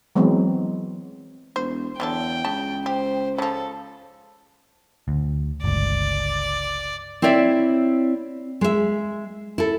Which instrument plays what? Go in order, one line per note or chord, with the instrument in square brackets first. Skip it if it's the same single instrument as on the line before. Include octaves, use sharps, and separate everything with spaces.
[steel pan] E3 F#3 G#3 B3 C4
[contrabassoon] E1 [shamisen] C5
[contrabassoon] E2 [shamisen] D3 F#3 A4 [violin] G5
[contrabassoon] C#2 [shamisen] C#3 A5
[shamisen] G4 [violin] C5
[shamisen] C#3 F3 [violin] A4
[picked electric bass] D2
[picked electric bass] G1 C#2 [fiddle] D5
[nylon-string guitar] C4 E4 C#5 D5 E5
G#3 E5
E4 A4